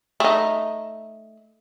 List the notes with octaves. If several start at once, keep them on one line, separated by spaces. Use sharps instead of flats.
A3 D#4